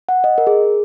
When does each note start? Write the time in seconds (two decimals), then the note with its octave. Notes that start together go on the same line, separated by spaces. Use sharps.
0.09 F#5
0.24 D#5
0.38 A#4
0.47 G#4